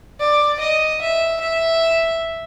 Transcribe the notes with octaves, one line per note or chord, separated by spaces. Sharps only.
D5
D#5
E5
E5